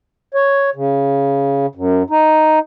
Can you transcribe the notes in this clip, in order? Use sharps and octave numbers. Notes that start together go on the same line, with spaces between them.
C#5
C#3
F#2
D#4